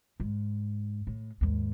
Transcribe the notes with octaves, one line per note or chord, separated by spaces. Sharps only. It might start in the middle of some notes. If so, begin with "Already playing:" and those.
G#2
A2
D#2 G#2